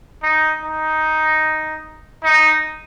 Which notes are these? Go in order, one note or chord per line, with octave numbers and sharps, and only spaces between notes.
D#4
D#4
D#4